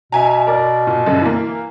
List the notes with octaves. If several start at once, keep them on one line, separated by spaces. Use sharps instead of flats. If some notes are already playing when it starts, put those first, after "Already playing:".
B2 E5 G#5 A#5
A#4 D5
A#2
F#2 D3
E3 A#3